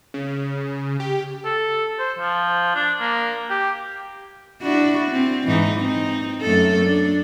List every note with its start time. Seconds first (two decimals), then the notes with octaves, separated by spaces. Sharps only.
0.14 C#3
1.00 G4
1.45 A4
1.99 C5
2.19 F3
2.75 D4
3.00 A#3
3.50 G4
4.62 D4 E4 F#4
5.11 C4
5.47 G#2 E3 D#4
5.80 C4 D#4
6.42 F#2 A3 A4
6.86 D4